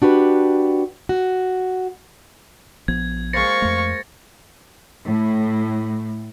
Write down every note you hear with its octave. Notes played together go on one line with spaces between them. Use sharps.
D4 F#4 G4 B4
F#4
A#1 F3 B3 G#6
G#3 A#3 C5 F5 C#6 A6 A#6 C#7
F2 A3
A2